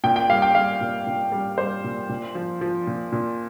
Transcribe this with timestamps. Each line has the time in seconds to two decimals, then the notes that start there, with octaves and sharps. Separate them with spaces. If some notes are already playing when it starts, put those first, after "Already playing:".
0.04 A#2 G5
0.16 G5
0.29 G3 F5
0.42 G5
0.55 G3 F5
0.81 A#2
1.07 A#2
1.32 G3
1.58 G3 C5
1.84 A#2
2.09 A#2
2.35 F3
2.61 F3
2.87 A#2
3.12 A#2